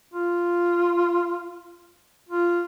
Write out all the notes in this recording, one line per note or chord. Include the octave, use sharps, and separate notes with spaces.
F4
F4